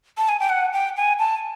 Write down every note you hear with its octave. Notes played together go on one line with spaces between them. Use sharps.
A5
G#5
G5
F#5
G5
G#5
A5